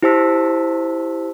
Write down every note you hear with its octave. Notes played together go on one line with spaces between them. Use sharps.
E4 G4 C5 A5 E6 B6